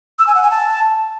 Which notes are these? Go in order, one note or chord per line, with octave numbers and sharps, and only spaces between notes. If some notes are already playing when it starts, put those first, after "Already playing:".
E6
G#5
F#5
G#5
A5